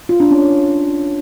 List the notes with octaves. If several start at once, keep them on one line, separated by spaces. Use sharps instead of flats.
F4
D4
C#4